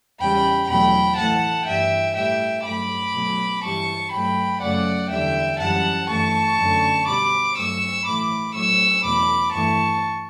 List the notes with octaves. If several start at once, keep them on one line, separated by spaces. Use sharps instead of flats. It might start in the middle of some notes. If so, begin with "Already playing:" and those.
E2 C#3 G3 G5 B5
E2 B2 F#3 A3 G5 B5
A2 E3 A3 F#5 A5
G2 E3 G3 E5 G5
A2 G3 E5 G5
G2 F#3 A3 B5 D6
B2 F#3 A3
G2 E3 G3 A5 C#6
G2 F#3 A3 G5 B5
F#2 C#3 F#3 A3 D5 F#5
E2 D3 G3 E5 G5
F#2 E3 G3 F#5 A5
G2 E3 A3 A5 C#6
F#2 D3 F#3 A3
B2 G3 B5 D6
G2 F#3 A3 C#6 E6
A2 E3 A3 B5 D6
A2 F#3 A3 C#6 E6
E2 B2 A3 B5 D6
G2 E3 A3 A5 C#6